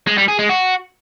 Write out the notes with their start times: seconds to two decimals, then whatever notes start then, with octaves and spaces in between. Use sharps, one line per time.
0.07 G#3
0.18 G3
0.28 G#4
0.39 G#3
0.49 F#4